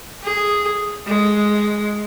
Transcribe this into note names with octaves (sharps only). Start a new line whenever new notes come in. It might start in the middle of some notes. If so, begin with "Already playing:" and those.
G#4
G#3